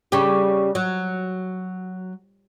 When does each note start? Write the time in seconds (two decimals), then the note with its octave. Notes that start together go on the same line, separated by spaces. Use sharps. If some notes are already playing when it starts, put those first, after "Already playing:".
0.12 C#3 G3 G4
0.75 F#3